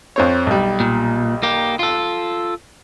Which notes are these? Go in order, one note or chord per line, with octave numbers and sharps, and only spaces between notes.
F2 C4 C#5
B1 G3
A#2
A#3 G4
F4 A4